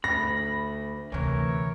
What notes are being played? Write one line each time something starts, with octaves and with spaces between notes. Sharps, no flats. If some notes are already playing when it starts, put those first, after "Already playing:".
D2 B5 A#6
D2 C3 E3 A#4 C#5